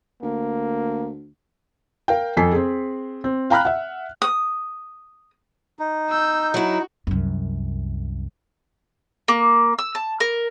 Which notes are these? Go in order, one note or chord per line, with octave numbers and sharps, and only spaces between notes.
D2 A#3
A#4 F5 G5
F2 A4 G#5 B6 C7
C4 G#4
C4
F5 G5 A#5 B5 F6 F#6
E5 F#5
D#6
D#4
E6 G6
F#3 E4 F#4
C2 F#2
A#3
E6
A5
A#4